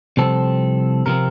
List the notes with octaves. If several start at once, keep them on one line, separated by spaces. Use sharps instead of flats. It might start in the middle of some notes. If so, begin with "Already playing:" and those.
C2 C3 F3 C4 A4
C3 F3 C4 A#4